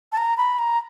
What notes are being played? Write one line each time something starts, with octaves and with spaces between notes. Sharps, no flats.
A5
A#5
B5
A#5